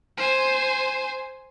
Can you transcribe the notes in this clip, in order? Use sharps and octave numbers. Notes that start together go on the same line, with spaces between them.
C5 G#5